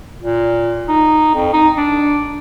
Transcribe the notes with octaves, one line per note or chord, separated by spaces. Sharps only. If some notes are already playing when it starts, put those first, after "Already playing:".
A#2
D#4
F2
D#4
D4